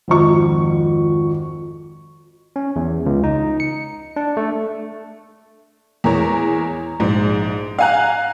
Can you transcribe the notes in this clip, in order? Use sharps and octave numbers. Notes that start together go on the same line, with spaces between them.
G#1 F2 C#6
C#4
E2
C#2
D#4
C#7
D4
A3
E2 G#3 A#4 C#5 A#5
A#1 G#2
F5 F#5 G#5 A#5 F#6